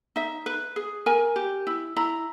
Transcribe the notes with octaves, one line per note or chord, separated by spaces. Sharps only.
D#4 E5
B4
G#4
A#4 G#5
G4
E4
E4 A#5